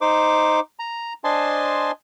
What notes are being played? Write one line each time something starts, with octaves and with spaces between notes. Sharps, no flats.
D#4 C5 D6
A#5
D4 C5 D#5 G#5 A5 C6